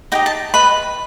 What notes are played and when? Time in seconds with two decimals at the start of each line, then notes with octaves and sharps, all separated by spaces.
0.12 D#4 G4 D#5 G5
0.26 A5
0.54 B4 D#5 B5